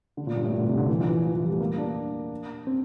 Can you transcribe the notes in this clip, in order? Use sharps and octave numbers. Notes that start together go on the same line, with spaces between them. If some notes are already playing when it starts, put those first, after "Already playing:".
D3
A#2
G2
A2
A#2
D3
C3
D3
E3
F3
E3
F3
E3
G3
A3
A#3
D4
C4